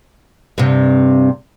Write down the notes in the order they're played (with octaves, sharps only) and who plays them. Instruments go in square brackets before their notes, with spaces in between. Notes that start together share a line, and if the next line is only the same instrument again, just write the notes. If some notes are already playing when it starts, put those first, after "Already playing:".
[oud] G2 C3